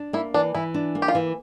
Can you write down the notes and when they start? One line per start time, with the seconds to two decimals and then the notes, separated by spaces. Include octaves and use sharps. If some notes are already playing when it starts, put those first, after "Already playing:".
Already playing: D4
0.13 A#3 E4
0.34 E3 D4
0.54 E3 E4
0.74 D4
0.95 A#3
1.02 G4
1.08 F4
1.15 E3